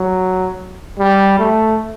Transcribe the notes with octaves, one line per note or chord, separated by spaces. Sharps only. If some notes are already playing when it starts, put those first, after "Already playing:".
Already playing: F#3
G3
A3